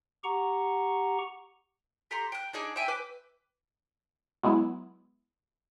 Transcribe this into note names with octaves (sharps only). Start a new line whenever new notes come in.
G4 F#5 A#5 C#6
G4 A4 A#5 C6
G5 F#6
D4 D#4 G#4 D5
E5 G5 G#5
B4 D6
F#3 G#3 B3 E4